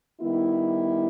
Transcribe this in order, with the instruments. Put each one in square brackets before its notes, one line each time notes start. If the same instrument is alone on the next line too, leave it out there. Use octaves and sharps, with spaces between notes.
[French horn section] D#3 G3 B3 E4